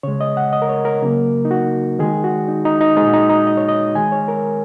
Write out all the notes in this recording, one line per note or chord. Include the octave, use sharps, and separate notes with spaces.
C#3 G#3 C#5
D#5
F#5
D#5
A#4
C#5
A#4
C#3 F#3 A#3
D#4
F#4
D#3 G#3 G#4
F#4
D#4
D#4
D#4
A#2 G#3 D#4
F#4
D#4
D#4
D#5
C#5
D#5
D#3 G#3 G#5
C#5
A#4